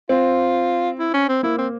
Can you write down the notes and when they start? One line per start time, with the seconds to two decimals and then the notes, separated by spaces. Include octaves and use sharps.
0.09 C4 F4
0.99 E4
1.14 C#4
1.29 C4
1.43 A#3 E4
1.58 C4